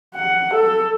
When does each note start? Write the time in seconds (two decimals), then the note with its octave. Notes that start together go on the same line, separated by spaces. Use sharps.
0.15 F#5
0.54 A4